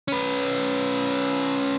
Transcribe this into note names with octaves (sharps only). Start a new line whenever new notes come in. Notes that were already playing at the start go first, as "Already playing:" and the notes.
C#4 B4